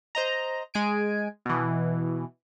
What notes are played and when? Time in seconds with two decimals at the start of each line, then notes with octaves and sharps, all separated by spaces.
0.15 C5 D#5 A#5
0.74 G#3 G#5 D7
1.45 B2 E3